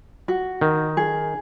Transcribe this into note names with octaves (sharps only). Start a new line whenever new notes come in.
F#4
D#3
G#4